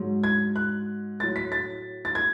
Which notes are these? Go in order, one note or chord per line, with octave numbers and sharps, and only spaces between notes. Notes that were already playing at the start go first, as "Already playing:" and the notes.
Already playing: G#2 F#3
G#6
F#6
A2 F#3 A6
B6
A6
A6
G#6